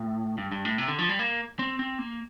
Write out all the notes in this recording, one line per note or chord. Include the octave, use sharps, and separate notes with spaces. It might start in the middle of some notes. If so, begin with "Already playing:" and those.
Already playing: A2
G2
G2
A2
C3
D3
F3
G3
A#3
C4
C4
A#3